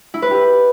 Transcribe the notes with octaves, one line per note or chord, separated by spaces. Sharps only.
E4
B4
G4